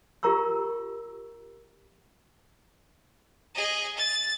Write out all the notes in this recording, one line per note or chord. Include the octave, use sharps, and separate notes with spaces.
F4 G4 A#4 A#5 C#6 E6
G#4 D#5
A6